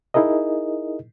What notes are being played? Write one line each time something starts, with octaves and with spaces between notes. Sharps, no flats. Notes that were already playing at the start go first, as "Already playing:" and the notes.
D#4 E4 G#4 A#4 D#5